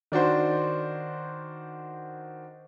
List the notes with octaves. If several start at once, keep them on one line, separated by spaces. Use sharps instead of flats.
D#3 D4 F#4 C5